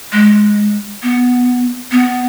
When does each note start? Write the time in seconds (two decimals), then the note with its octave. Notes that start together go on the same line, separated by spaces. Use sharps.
0.13 G#3
1.03 B3
1.92 B3